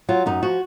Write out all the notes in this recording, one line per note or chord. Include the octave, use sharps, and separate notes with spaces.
F#3 F4
F#2 D#4
F3 F#4